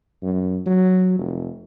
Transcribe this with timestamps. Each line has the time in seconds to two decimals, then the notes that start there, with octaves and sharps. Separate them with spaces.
0.23 F#2
0.66 F#3
1.19 F1